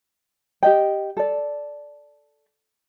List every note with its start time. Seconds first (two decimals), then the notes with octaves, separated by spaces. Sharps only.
0.63 G4 D#5 G5
1.17 A4 D5